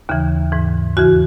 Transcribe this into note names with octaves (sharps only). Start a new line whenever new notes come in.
D#2 C#3 E3
G#2 E3
E2 C#3 E3 F#4